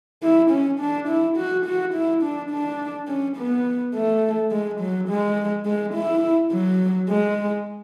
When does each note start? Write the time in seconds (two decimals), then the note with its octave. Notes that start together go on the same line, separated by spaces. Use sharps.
0.22 E4
0.50 C#4
0.79 D4
1.08 E4
1.37 F#4
1.65 F#4
1.93 E4
2.22 D4
2.51 D4
3.08 C#4
3.37 B3
3.94 A3
4.51 G#3
4.80 F#3
5.09 G#3
5.66 G#3
5.94 E4
6.52 F#3
7.09 G#3